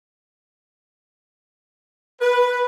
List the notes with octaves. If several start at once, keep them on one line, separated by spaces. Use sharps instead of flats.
B4